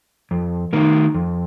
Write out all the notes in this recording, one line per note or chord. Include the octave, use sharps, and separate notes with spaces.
F2
D#3 A3 D#4 A#4
F2